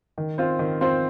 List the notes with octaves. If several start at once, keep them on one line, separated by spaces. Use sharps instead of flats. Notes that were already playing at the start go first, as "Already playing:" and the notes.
D#3
C4 F4 C5
D#3
C4 F4 C5